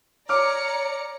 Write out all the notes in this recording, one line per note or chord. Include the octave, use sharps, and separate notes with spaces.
C#5 D5 A#5 D6 F6 C#7